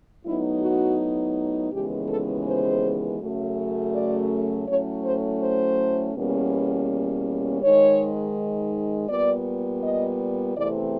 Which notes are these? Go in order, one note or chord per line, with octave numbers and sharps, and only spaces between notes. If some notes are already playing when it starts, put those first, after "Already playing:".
A2 F#3 B3 D#4 E4
F#4
D#2 C#3 E3 G#3 B3 G4
A4
C5
F#2 C#3 F#3 A3
D5
A2 F#3 A3 C#4 C#5
C5
C5
E2 B2 G3 A#3 C#4
G#2 D#3 G#3 C#5
A#2 G3 B3 D5
D#5
E2 C3 E3 A3 C4 D5